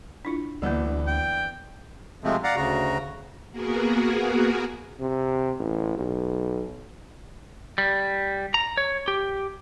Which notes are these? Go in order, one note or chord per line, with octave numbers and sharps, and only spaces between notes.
D4 E4 F4
D2 E3 G3 A#3 B3 D4
G5
C3 F3 G#3 A3 C4
D5 F5 F#5 A#5
D2 C#3 F#4 A#5
A#3 B3 F#4 G#4 A#4
C3
A1
B1
G3
A#5
C#5
G4